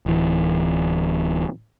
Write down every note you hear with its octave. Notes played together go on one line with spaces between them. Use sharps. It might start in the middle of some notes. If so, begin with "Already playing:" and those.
D1 E3